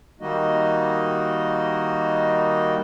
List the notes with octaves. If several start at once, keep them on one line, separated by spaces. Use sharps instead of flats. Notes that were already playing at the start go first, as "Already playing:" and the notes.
D#3 G3 A#3 D#4 F#4 D#5